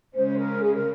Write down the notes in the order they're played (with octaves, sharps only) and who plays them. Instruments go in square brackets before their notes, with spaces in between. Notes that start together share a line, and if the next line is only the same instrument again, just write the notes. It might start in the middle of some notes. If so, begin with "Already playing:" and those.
[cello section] C#3 G#3 C#4 [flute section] C5
[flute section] A#4
G#4
A#4